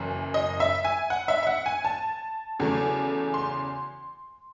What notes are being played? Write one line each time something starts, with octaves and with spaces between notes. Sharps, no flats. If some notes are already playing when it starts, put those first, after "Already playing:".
Already playing: F#1 F#2 E3
D#5
E5
G#5
F#5
E5
E5
F#5
G#5
A5
E2 C#3 F#3 A3
C6